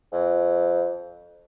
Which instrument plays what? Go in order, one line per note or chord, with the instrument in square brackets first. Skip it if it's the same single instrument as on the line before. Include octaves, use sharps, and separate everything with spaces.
[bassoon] F2